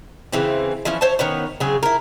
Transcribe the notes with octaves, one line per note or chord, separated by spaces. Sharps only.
C#3 E3 C4
E3 F3 C#4 E4
C5 C#5 E5 A5
D#3 B3 C#4
C#3 F#3 C4 G#4
E4 A#4